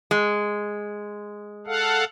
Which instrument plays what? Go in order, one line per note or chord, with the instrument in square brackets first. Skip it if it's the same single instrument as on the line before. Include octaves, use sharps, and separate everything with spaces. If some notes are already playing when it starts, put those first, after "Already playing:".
[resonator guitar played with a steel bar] G#3
[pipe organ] A4 F5 F#5